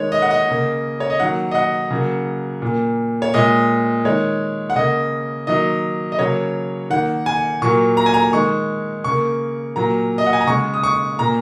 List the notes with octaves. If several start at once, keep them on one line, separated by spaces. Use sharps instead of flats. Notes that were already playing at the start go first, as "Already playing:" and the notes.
Already playing: D#3 G#3 C#5
D#5
F#5
D#5
C#3 A#3
C#5
D#5
D#3 F#3 A#3 F#5
D#5
F#5
C#3 F#3 A#3
A#2 A#3
C#5
A#2 G#3 D#5
D#3 G#3 C#5
F#5
C#3 A#3 D#5
D#3 F#3 A#3 D#5
D#5
C#3 F#3 A#3 C#5
D#3 A#3 F#5
G#5
A#2 F#3 A#3 C#6
A#5
G#5
A#5
D#3 G#3 C#6
C#3 A#3 C#6
A#2 F#3 A#3 A#5
D#5
F#5
G#5
A#5
C#3 G#3 C#6
D#6
C#6
A#2 A#3 A#5